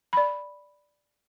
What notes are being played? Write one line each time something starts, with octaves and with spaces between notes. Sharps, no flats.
D5 B5